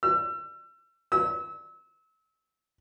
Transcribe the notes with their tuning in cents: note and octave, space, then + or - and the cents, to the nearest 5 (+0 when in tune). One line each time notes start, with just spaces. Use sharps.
E6 +35
E6 -30